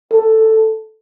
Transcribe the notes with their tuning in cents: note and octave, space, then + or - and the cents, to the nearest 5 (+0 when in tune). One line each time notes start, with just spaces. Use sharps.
A4 +5